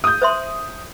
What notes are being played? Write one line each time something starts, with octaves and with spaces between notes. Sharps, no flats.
D#6 G6
C5 E5 C6